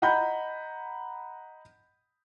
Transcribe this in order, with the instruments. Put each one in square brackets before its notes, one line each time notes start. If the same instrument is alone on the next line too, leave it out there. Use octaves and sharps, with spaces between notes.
[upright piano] D#5 F#5 A#5 B5 G6